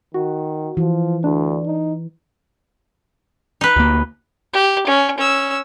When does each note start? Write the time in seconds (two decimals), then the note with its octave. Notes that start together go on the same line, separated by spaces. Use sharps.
0.14 D#3 F#4
0.77 E3 F3
1.24 D2 D4
1.66 D#4
3.61 D#4 B4
3.76 D2 A#3
4.53 G4
4.87 C#4
5.17 C#4 E6